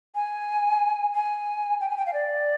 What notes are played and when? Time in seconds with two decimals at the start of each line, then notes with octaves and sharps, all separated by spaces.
0.15 G#5
1.15 G#5
1.81 G5
1.90 G#5
1.97 G5
2.06 F5
2.14 D5